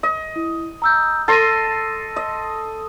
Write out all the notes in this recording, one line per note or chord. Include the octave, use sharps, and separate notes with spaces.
D#5
E4
A#5 E6 G6
A4 C6 A6 A#6 D#7
D#5